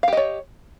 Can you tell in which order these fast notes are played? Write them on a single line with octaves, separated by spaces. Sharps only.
F5 G4 D#5 C#5